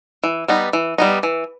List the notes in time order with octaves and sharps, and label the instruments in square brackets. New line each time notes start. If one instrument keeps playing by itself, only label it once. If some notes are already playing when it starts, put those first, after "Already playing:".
[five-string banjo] E3
G3 B3 D#4
E3
G3 B3 D#4
E3